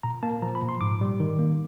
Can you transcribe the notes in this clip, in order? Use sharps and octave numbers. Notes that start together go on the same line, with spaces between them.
A#2 A#5
A#3 A5
F3 A#5
B5
A#2
C6
G#2 D6
G3
D#3
A#3